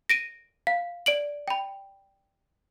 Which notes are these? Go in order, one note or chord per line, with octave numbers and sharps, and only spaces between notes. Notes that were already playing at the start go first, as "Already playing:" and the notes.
A#6 D7 D#7
F5
D5 D7 F#7
G5 B5